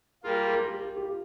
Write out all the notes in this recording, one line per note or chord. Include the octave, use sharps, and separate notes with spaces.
G3 A#3 F4 G#4
G#4
G#4
A#4
G4
G4
G4
F4